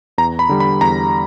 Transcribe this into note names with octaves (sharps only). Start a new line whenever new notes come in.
E2 A#5
B5
D3 G3
B5
E2 A#5